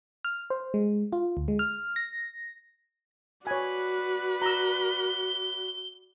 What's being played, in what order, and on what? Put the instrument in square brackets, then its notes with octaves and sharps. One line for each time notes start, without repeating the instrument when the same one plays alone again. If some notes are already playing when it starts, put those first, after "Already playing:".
[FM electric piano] F6
C5
G#3
F4
D2
G#3
F6
A#6
[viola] F#4 [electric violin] B4 D5 [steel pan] C#5 G#5
[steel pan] A#5 E6 [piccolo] G7